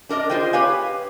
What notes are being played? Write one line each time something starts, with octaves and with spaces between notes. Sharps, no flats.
D4 A#4 D5 D#5
F4 G#4 C5 D#5 G5
G4 B4 C#5 F5 G#5